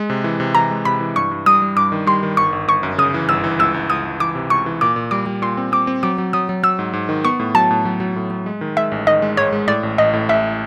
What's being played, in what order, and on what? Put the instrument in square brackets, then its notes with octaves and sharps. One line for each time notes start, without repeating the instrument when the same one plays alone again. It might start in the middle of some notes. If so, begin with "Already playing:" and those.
Already playing: [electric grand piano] G#3
C3
E3
C3
[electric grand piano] E3 [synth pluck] A#5
[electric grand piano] G#3
[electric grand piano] C3 [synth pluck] B5
[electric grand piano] E3
[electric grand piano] G2 [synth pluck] C#6
[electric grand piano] G2
[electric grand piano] G3 [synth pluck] D#6
[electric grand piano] G3
[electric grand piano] G2 [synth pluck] D6
[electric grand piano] D#3
[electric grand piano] G3 [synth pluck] C6
[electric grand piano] D#3
[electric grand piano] G1 [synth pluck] C#6
[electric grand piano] G1
[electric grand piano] G1 [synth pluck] C#6
[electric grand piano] F#2
[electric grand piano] C#3 [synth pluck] D#6
[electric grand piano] E3
[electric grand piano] G1 [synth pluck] E6
[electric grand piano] E3
[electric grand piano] C#2 [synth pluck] E6
[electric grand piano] C#2
[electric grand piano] C#2 [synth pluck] D#6
[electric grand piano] C#2
[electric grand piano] E3 [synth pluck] D6
[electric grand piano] C3
[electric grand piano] C#2 [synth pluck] C#6
[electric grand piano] E3
[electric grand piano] A#2 [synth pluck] D6
[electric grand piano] A#2
[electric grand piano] G3 [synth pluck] D6
[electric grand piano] G3
[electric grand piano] A#2 [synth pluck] C6
[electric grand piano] C4
[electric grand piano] C4 [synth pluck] D6
[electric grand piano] C4
[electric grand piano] F#3 [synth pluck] D6
[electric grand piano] F#3
[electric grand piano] F#3 [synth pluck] D#6
[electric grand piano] F#3
[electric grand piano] F#3 [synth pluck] E6
[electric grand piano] G#2
G#2
D#3
[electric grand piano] B3 [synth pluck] C#6
[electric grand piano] A2
[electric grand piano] F#3 [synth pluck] A5
[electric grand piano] A2
F#3
F#3
A2
F#3
G#3
D#3
[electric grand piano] G#3 [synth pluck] E5
[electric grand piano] A1
[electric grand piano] D#3 [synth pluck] D#5
[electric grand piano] G#3
[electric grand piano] G#2 [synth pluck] C#5
[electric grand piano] G#3
[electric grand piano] A2 [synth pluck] D5
[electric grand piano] A1
[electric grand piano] A1 [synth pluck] D#5
[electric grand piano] A2
[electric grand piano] A1 [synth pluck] E5